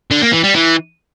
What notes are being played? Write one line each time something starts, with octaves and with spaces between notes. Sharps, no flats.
D3
A#3
E3
G3
E3